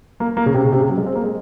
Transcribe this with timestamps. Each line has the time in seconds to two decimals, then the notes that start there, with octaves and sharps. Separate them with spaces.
0.20 A#3
0.37 A#3
0.46 C#3
0.54 C3
0.65 C#3
0.72 C3
0.81 C#3
0.89 F#3
0.98 G#3
1.07 C4
1.15 A#3
1.24 G#3